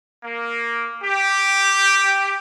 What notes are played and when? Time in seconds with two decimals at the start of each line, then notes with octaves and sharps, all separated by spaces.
0.24 A#3
1.02 G4